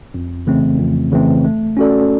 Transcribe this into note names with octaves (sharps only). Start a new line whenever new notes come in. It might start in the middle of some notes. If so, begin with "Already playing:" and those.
F2
C#3 E3 A3 C4
F2
C#3 E3 A3 C4
A3
C#4 F#4 A4 D5